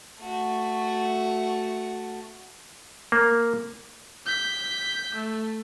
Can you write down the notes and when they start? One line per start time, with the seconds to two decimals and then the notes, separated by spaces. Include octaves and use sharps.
0.22 A3 F#4
3.12 A#3
4.26 G6 B6
5.15 A3